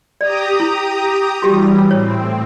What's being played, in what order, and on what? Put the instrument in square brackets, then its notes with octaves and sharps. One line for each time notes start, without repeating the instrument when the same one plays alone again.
[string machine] G4 A#5 D#6 [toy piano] D5
[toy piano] E4
[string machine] E3 G3 [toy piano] F#4 G4
[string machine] A2 C4 [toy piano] C#5